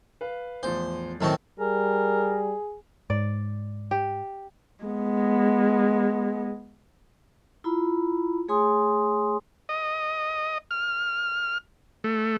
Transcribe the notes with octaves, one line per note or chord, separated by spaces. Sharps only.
B4 F5
A1 E2 F3 C5
F#2 A2 D#3 C4 A5 C#6
G3 G#4 A#4
G#2 D5
G4
G#3 B3
E4 F4 A#5 B5
A3 G#4 C#5 G#5 C6 D#6
D#5
F6
A3